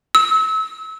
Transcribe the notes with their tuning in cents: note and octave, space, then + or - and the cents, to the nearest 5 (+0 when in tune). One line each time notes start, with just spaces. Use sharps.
E6 -30